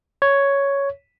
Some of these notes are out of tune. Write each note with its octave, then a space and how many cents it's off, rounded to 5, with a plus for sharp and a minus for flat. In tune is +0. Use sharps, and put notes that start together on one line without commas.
C#5 +5